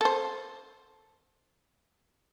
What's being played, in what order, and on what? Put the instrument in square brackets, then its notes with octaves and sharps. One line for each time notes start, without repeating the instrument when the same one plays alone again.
[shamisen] A4 C5